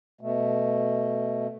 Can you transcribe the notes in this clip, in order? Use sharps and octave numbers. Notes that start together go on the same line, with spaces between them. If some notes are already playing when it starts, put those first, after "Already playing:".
B2 A3